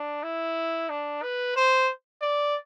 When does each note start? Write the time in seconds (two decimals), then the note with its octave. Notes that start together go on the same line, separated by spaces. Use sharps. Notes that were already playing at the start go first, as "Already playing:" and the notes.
Already playing: D4
0.23 E4
0.90 D4
1.22 B4
1.56 C5
2.22 D5